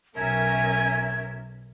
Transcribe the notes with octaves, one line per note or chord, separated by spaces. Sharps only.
B1 C#4 A#4 E5 G#5 G#6